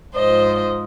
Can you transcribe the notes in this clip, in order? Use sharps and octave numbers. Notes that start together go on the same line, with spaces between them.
G#2 F3 C5 D#5